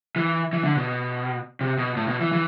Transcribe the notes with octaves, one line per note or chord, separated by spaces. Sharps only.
E3
E3
D3
B2
C3
B2
A2
B2
E3
E3